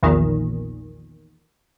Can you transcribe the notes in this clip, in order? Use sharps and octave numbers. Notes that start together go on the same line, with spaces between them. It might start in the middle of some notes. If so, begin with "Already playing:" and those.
A#1 E2 A#2 D#3